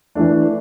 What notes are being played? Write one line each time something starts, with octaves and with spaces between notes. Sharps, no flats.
E3 A3 D4